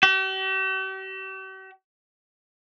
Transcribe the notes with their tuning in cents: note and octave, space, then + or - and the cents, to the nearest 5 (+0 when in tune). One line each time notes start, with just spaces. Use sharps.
G4 -45